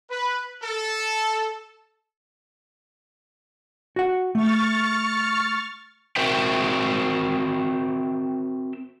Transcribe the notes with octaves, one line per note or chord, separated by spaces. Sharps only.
B4
A4
F#4 F#5
A3 C#6 F6 A6
C4 F#4 A#4 C5 E5 G5